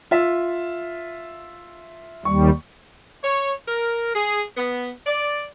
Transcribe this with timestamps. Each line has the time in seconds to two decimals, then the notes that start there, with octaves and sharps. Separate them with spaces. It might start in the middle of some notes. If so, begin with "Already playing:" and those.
0.11 F4 E5
2.25 D#2 G3 C#6
3.23 C#5
3.68 A#4
4.14 G#4
4.57 B3
5.06 D5